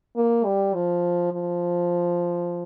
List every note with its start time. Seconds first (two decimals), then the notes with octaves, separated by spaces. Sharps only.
0.16 A#3
0.45 G3
0.74 F3
1.33 F3